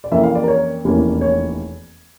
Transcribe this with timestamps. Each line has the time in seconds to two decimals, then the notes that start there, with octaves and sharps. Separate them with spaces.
0.04 D5
0.11 F2 E3 A#3 C#4 E5
0.23 F5
0.35 D5
0.43 A#4
0.48 C#5
0.85 F1 E2 E3 A#3 C#4
1.21 C#5